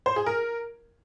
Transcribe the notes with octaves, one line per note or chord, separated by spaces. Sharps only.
C5
G#4
A#4